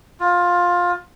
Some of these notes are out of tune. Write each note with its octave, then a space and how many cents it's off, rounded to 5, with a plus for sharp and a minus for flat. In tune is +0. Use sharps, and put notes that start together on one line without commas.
F4 +15